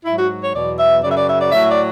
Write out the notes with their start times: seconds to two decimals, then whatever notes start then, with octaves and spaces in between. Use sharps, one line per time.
0.04 G#2 F#3 E4
0.17 F#4
0.41 C#5
0.53 E2 B2 F#3 D5
0.78 E5
1.03 F#2 C#3 F#3 D5
1.09 E5
1.15 D5
1.28 E5
1.40 D5
1.52 A2 F#3 E5
1.68 D5